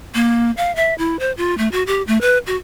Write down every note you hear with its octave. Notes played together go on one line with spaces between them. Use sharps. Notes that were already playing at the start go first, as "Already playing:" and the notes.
A#3
F5
E5
E4
C5
F4
A3
F#4
G4
A3
B4
F#4